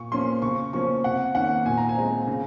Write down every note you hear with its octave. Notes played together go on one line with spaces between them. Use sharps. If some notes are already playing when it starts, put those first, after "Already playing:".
Already playing: A#2 C#6
F3 A#3 C#4 C6
C#3 C#6
F3 A#3 C#4 C#6
C3 F#5
D#3 A#3 C#4 F#5
A#2 G#5
A#5
G#5
G#3 C4
C#3